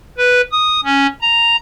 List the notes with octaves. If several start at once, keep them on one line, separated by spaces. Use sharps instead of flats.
B4
D#6
C#4
A#5